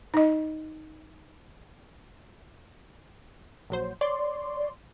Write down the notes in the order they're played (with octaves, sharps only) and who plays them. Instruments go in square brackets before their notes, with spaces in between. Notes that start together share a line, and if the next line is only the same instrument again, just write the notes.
[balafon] D#4 D#5
[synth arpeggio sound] A#1 F#3 C5
C#5 D5 C6